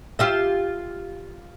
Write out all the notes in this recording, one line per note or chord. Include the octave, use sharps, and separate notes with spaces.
F4 G4 E5